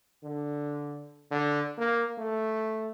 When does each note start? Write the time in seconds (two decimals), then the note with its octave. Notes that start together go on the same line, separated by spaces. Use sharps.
0.23 D3
1.31 D3
1.78 A#3
2.18 A3